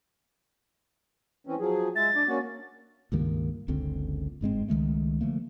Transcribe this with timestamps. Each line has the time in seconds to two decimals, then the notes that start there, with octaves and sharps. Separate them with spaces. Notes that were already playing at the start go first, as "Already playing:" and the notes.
1.47 E3 C4 C#4
1.60 F3 F#3 G#4
1.96 G#3 E5 A6
2.15 D4 D5
2.28 A#3 C#4 F#4
3.12 C#2 G2 D#3 A#3
3.68 F#1 C#2 D3 C4
4.41 G1 G#2 G#3 C4
4.68 C#2 D#3 G#3 A3
5.21 D3 F3 A3 A#3